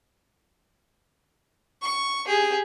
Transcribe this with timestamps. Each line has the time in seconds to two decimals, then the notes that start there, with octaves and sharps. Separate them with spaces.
1.82 C#6
2.27 G4 G#4